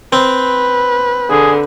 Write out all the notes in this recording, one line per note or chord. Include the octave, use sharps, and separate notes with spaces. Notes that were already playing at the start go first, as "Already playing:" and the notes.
C4 B4
D3 G#4